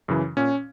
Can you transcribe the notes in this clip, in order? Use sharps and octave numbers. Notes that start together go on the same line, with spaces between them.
F#2 C#3 E3
A#2 C#4